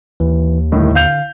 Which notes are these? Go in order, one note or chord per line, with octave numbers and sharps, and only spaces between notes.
D#2 E3
C2 A2 D3 D#3
F5 G6 F7